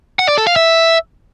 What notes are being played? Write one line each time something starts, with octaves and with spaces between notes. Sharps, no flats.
F#5
D5
A4
F5
E5